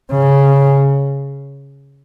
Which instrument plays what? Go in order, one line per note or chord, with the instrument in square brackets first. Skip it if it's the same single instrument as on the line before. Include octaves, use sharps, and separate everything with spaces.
[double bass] C#3